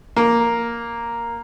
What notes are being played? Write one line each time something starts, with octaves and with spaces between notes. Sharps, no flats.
A#3